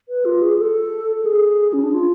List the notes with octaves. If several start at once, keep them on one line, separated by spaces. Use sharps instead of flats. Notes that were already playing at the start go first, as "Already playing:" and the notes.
B4
F4
G#4
A4
A4
G#4
C#4
D4
F4